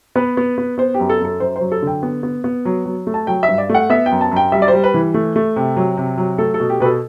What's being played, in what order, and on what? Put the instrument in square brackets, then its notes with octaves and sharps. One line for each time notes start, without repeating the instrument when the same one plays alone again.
[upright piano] B3 B4
B3
B3
B3 C5
G4
F#2
A4
F#2 A4
F#2 C5
C5
F#3
A4
D3 G5
B3
B3
B3
F#3
F#3
A3
A5
F#3 G5
E5
G2
D5
A3 F#5
B3 E5
G5
F#2
A5
F#2 G5
G3 E5
D5
C5
G3
B4
E3
A3
A3
C3
F#3
C3
F#3
A3 A4
A4
B2
G4
B2 B4
A4